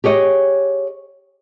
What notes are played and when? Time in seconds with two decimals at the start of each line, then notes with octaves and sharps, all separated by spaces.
0.04 G4 G#4 C#5 D#5